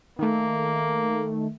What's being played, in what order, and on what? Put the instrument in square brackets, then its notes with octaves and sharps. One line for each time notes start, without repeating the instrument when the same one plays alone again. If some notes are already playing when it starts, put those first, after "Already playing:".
[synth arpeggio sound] D#3 A3 [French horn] A#3